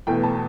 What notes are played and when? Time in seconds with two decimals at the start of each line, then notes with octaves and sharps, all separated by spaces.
0.07 E2 B2 A3 G5
0.23 A5